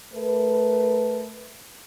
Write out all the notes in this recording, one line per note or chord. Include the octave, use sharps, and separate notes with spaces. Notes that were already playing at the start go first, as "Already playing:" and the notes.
A3 A#4 B4